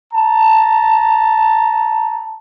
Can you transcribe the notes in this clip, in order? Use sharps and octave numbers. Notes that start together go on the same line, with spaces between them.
A5 A#5